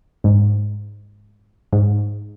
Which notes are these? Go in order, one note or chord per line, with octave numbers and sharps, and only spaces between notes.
G#2
G#2